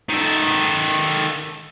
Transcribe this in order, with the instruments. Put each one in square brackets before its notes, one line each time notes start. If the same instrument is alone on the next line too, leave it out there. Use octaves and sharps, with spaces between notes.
[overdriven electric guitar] D#3 A4